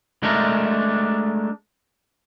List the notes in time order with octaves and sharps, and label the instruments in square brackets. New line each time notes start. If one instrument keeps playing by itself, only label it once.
[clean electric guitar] G#3 A3 D4 A#4